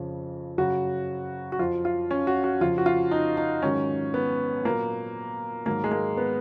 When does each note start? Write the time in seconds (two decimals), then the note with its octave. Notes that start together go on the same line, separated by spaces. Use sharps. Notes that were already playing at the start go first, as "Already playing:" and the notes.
Already playing: F2 C#3 F3
0.58 F#2 C#3 F#3 F#4
1.52 F#4
1.59 F2 F3 F4
1.85 F4
2.11 C#4
2.27 F#4
2.44 F#4
2.61 F2 C#3 F3 F4
2.78 F#4
2.86 F4
3.11 D#4
3.37 D#4
3.62 G#2 D#3 F#3 C#4
4.14 B3
4.65 A#2 F#3 A#3
5.66 G#2 D#3 F#3 A#3
5.84 G#3
5.91 A#3
6.17 B3